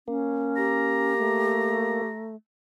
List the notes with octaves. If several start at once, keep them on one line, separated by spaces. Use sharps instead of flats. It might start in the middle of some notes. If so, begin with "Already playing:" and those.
A#3 C#4
G4 A#5
A3